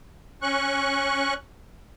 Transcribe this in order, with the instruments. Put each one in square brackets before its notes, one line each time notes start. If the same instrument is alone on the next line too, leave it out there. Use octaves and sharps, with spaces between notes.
[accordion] C#4 C#6 F#6